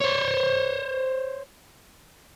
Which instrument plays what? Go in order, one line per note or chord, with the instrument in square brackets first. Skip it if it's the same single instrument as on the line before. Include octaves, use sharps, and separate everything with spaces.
[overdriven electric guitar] C5 C#5